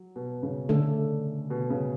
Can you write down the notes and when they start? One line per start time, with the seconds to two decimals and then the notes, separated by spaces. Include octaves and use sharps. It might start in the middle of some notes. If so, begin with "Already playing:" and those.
Already playing: F#3
0.16 B2
0.43 C#3
0.69 D3 A3 D4 A4
1.50 B2
1.70 C#3